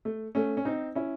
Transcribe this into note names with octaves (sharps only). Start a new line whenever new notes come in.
A3
A3 C#4
C#4
C4 D#4
C#4 E4